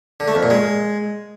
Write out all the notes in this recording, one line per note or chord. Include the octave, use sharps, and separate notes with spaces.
D3
A3
F2
A#2
G#3